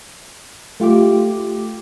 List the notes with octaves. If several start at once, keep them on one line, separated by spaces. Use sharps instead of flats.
A3 F4 G4 D6